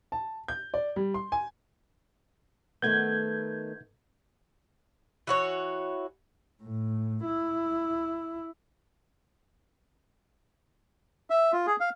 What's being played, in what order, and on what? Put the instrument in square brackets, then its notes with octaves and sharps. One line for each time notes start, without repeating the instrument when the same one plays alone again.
[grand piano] A5
G6
D5
G3
C6
G#5
[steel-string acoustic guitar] D#3 A3 B3 [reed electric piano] G6 G#6
[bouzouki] E3 F#4 C#5
[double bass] A2
E4
[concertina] E5
F4
G#4
F5